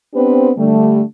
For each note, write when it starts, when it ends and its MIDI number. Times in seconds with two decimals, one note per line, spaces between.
0.14 0.51 59
0.14 0.51 60
0.14 0.51 62
0.14 0.51 67
0.14 0.51 71
0.14 0.51 72
0.58 1.02 50
0.58 1.02 55
0.58 1.02 57